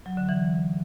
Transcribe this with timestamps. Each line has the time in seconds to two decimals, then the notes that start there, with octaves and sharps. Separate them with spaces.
0.06 F#3
0.17 D3
0.29 E3